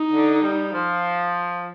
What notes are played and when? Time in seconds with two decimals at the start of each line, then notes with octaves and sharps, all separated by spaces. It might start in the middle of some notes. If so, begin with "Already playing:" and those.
Already playing: D#4
0.11 D3
0.41 G3
0.72 F3